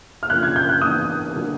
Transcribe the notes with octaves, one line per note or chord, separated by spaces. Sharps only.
F6
F#2 C#3 F3 A#3 D4 F#6
G#6
G6
F#6
G#2 E3 G#3 B3 D4 D#6
D3 F#3 A#3